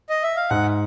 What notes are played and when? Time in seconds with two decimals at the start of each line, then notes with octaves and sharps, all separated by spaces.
0.09 D#5
0.23 E5
0.37 F5
0.50 G#2 F#5